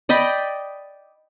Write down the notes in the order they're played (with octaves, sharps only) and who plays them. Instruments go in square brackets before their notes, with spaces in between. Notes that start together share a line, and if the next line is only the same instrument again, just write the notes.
[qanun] D5 D#5 G5 B5